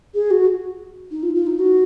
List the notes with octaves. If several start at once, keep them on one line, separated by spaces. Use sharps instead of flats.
G#4
F#4
D#4
F4
F4
D#4
F#4